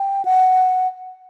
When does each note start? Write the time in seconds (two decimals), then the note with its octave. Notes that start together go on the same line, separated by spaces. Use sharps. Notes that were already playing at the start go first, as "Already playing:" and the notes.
Already playing: G5
0.25 F#5